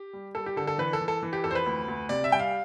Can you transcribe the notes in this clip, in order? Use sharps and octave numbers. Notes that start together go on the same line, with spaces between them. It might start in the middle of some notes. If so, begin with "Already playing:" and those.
Already playing: G4
G3
G3 A4
G4
D3 A4
A4
E3 B4
A4
E3
A4
E3
G4
F2 A4
C5
B4
D2
D2
C3 D5
E5
G3 G5
F5